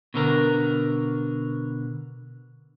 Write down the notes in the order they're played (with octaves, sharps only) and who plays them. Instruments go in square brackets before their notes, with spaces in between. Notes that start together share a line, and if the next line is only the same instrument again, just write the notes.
[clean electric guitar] B2 D3 A#4